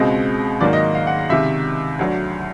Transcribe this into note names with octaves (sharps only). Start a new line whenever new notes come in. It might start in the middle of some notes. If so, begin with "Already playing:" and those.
Already playing: C#2 B2 G#3 C4 D#5
G#2 D#3 F#3 A#3 D5
D#5
F5
F#5
C#2 C3 D#3 E5
D2 D3 F#3